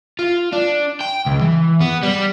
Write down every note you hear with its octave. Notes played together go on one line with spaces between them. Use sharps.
F4
D4
G5
C#2
E3
B3
G3